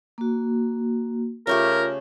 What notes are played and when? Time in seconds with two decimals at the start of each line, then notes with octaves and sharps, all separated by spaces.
0.18 A#3 F#4
1.47 C#3 A3 F4 G4 A#4